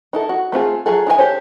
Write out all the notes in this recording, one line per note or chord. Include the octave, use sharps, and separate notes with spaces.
D#4 E4 A4
F#4
A3 C4 F4 G#4
F#3 F4 G#4 A4
D#4 E4 F#4 G#5
G4 A4 C5 C#5